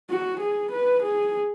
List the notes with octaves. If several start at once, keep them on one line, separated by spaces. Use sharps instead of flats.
F#4
G#4
B4
G#4